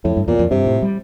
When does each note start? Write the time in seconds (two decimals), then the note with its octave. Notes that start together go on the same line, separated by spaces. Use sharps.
0.04 F2 A2
0.17 G2
0.27 E2 A#2
0.39 F2
0.51 G2 C3
0.66 A2
0.82 G3